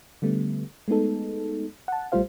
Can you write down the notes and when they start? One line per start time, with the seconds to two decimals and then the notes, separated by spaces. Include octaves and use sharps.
0.22 D3 G3 A3 B3
0.88 G#3 A3 B3 D#4 A4
1.88 F#5 A5
2.12 A#1 G3 A3 F4 C5 F5